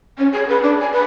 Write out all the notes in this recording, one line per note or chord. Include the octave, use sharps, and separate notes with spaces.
C#4
G#4
B4
D4
G#5
B4